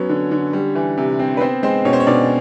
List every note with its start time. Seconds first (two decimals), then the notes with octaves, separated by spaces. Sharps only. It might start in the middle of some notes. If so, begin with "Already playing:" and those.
Already playing: F#3 B3 C#4 C#5
0.09 D3
0.31 D3
0.53 G3
0.75 E3
0.97 C3
1.19 C4
1.37 B4
1.41 B3 C4 C5
1.63 G#3 C4 C5
1.85 B2 C#4 C#5
1.93 C5
2.00 C#5
2.07 B2 D4 D5